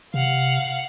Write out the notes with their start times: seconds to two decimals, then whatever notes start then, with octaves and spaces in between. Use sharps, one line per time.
0.14 C3 F5 F#5